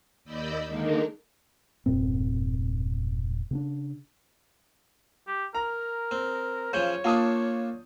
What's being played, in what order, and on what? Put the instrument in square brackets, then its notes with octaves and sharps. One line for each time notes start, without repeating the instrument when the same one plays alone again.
[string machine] D#2 D5 D#5 B5 E6 G6
D3 D#3 G#3 A#3 D4 D#4
[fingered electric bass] E1 G2 A#2 C4
C#3 C4 D4
[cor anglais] G4
[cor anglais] A#4 [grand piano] A#5
[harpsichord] C4
[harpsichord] C#3 F3 C#4 [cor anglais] C#5 [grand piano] G6
[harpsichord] A#3 D4 [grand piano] F4 A5 D#6